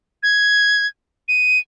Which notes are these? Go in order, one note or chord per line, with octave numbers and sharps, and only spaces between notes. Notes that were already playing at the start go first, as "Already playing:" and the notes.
G#6
D#7